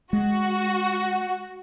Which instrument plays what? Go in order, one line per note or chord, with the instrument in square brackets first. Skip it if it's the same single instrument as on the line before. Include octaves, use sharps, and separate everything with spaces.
[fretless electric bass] G#3 [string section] F#4